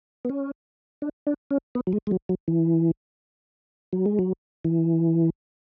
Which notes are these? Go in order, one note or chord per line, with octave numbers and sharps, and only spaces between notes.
B3
C#4
D4
D4
C#4
B3
F#3
G#3
G#3
F#3
F#3
E3
F#3
G#3
F#3
E3